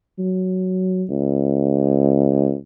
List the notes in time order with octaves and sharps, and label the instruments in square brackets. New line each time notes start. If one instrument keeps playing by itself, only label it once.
[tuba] F#3
C#2